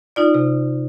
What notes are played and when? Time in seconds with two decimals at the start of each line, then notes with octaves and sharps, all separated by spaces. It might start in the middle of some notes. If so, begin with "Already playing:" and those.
0.16 D#4 F4 D5
0.34 C3